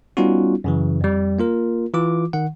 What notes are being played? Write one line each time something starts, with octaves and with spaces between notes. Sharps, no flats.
G3 B3 C#4 D#4 F4 F#4
F#2 C#3 E3
F2 G3
A#3 F4 A#4
E3 F4 D6
D#3 F#5